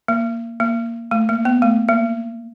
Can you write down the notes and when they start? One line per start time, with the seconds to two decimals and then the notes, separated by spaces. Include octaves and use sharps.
0.08 A#3
0.60 A#3
1.11 A3
1.29 A#3
1.45 B3
1.62 A3
1.88 A#3